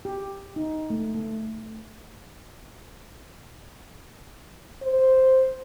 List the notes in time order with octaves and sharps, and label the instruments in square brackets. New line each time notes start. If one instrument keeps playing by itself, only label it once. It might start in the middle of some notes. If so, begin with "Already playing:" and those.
[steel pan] G4
D#4
A3
A3
[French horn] C5